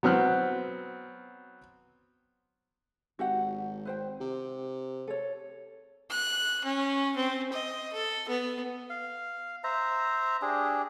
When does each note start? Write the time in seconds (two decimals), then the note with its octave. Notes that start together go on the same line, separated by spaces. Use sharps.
0.03 F#3 B3 C4 F6 F#6
3.19 G#1 F#4 G4 F#5
3.85 B4 C5 G5
4.20 C3
5.07 A4 C#5
6.10 F#6
6.64 C#4
7.16 C4
7.53 D#5
7.93 A4
8.28 B3
8.90 F5
9.64 C5 E5 A#5
10.42 D4 G4 G#4